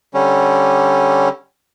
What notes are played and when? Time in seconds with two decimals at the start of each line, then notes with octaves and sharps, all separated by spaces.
0.14 D3 G3 C#4